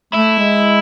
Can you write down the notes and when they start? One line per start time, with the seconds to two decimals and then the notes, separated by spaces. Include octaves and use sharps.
0.13 A3 E4
0.39 G#3